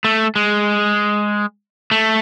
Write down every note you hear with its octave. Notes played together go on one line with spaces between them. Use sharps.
A3
G#3
A3